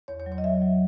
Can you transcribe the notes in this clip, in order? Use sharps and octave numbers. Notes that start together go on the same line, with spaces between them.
E2 C#5
C#5
F#3
C#5
D#5
F#3 E5
F#3